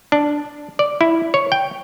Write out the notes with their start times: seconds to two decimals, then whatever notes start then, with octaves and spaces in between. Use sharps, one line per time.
0.12 D4
0.79 D5
1.01 E4
1.34 C#5
1.52 G5